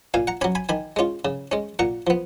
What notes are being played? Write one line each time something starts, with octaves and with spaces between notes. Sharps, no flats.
A#2 F5 G#5
F#5 A#5
F#3 C#4 G#5 B5
G#5 B5
D#3 G#5 B5
G#3 C#4 F4
C#3
G#3 C#4
A#2 F#5 A#5
F3 B3